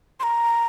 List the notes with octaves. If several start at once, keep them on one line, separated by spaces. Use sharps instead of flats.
C6
A#5